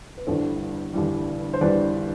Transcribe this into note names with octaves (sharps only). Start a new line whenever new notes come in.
B4
G1 G2 E3 G3 A4 C5
G1 G2 E3 G3
C5
G1 G2 E3 G3 B4 D5